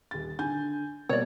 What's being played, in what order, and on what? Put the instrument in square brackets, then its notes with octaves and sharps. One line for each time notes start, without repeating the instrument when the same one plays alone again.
[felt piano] D#1 A6
D3 G#5 G6
[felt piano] B2 G3 A#3 [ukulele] C#5 D5